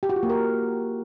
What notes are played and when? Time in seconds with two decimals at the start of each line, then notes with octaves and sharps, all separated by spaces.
0.03 G4
0.09 F#4
0.16 F4
0.23 A#3
0.30 A#4